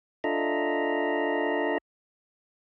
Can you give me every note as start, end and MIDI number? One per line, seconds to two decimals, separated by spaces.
0.24 1.78 62
0.24 1.78 65
0.24 1.78 69
0.24 1.78 75
0.24 1.78 76
0.24 1.78 82